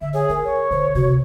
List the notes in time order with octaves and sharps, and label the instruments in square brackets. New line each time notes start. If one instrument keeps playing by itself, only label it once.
[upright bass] D3 [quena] E5
[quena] G#4 [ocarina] C#5
[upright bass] A#3 [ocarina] A#4
[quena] C#5
[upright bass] B2 D3 [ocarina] C5
[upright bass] C3 [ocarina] F#4